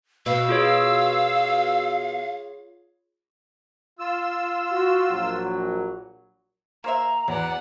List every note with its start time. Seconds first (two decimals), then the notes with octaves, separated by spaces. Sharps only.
0.26 B2 F5 E6
0.49 F4 G#4 C#5
3.99 F4 E6
4.72 F#4
5.10 A#1 F#3
6.84 A#3 C5 E5 A#5
7.28 E2 F#3 D5 F#5